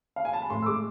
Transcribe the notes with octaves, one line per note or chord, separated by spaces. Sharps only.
F5
G#5
A5
B5
A2 C6
E6
G#3 D6